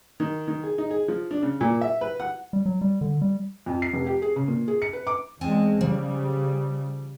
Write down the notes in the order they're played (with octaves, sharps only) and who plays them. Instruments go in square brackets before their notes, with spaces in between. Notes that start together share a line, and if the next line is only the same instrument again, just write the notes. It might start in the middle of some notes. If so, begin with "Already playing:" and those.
[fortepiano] D#3
D#3
G#4
D#4
G#4
F3
D4
C#3
A#2
E5
B4
F#5
[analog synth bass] G3
F#3
G3
D3
G3
[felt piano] F2
C7
F1
G4
G#4
C#3
A#2
G#4
C#7
B4
D6
[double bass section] E2 G#3 [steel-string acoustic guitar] C4 G#5 A5
[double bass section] C#3 G3 [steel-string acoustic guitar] F3